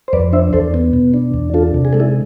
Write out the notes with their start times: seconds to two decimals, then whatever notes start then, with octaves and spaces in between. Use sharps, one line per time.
0.08 C5
0.13 F2 B4 D5
0.33 D4 C5 E5
0.53 E2 A4 C5
0.74 B3
0.93 B2
1.14 D4
1.34 E2
1.54 D4 F4 A4
1.74 C3
1.85 G#4
1.93 G#3 A4
2.00 E4 G#4